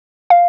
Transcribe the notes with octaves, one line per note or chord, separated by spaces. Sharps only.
F5